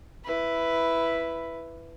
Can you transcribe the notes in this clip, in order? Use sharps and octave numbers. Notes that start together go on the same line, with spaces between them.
E4 B4